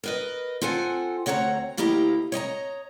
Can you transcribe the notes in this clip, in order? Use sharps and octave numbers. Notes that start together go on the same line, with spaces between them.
A#4 B4 D#5
C4 F4 A4 F#5 G#5
D2 C4 C#5 F#5 G#5 A#5
D2 A#3 E4 G4 D#5 A#5
C#5 D#5 G#5 A#5